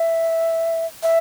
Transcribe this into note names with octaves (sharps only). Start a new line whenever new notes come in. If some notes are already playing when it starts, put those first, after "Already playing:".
Already playing: E5
E5